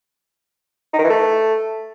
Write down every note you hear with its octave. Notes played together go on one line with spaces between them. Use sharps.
D#4
D#3
E3
A3